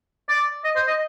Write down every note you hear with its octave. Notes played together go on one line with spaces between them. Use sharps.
D5
D#5
C5
D#5